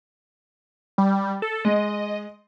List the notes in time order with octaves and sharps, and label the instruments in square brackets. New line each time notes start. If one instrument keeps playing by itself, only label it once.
[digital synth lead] G3
A4
[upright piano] G#3 [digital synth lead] D#5